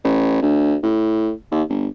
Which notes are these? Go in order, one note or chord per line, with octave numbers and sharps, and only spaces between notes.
A1
D2
A2
D#2
G1